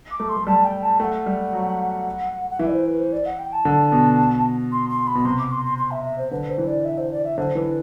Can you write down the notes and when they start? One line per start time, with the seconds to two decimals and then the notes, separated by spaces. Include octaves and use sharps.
0.11 D6
0.20 A3
0.29 C6
0.37 A3
0.46 G3 A5
0.64 G5
0.83 A5
1.00 A3 G5
1.04 F#5
1.26 G3
1.53 F#3
2.50 F#5
2.59 E3 E5
2.67 D5
2.73 C5
2.86 B4
2.99 C5
3.13 D5
3.26 F#5
3.39 G5
3.53 A5
3.65 D3
3.92 B2
4.72 C6
4.90 C6
5.07 B5
5.15 B2
5.25 C3 C6
5.38 D6
5.52 C6
5.65 C6
5.78 C6
5.91 E5
6.05 E5
6.18 C5
6.31 D3 B4
6.49 C5
6.58 E3
6.67 D5
6.85 E5
6.98 C5
7.11 D5
7.24 E5
7.37 D3 C5
7.55 E3 B4